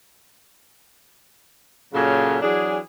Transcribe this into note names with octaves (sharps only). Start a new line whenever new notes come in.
A#2 C#3 F#3 A4 A#4 G#5
E3 F#3 D4 G#4